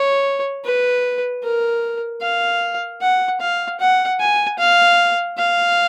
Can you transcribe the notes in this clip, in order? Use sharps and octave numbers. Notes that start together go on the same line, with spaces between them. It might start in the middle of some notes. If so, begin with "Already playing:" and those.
Already playing: C#5
B4
A#4
F5
F#5
F5
F#5
G#5
F5
F5